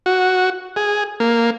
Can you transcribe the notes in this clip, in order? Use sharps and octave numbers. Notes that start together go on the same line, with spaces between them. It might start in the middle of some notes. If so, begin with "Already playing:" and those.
F#4
G#4
A#3